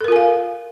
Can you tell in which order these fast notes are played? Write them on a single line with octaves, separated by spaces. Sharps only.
A4 A#4 F4 G#5 F5